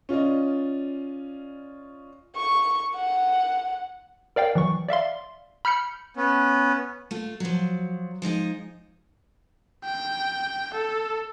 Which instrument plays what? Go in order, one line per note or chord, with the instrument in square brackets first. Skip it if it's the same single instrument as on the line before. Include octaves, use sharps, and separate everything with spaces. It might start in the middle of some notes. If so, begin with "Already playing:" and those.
[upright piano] C#4 F4 D5 D#5
[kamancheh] C#6
F#5
[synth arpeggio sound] A#4 D5 F5 G5
E3 F#3 C#6
D5 E5 F5 C6
B5 F6 G6 C#7
[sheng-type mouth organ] B3 C#4
[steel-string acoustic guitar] A3 F4
F3 F#3
F3 G#3 D#4 D#5
[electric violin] G5
A4